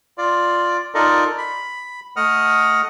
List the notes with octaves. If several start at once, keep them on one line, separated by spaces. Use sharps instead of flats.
F4 D5
D#4 F4 A4 A#4 D5 D#5
B5
A3 D#5 F#5 D#6 F6